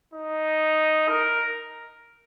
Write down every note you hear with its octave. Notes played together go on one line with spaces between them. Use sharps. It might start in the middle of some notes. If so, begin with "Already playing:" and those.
D#4
A#4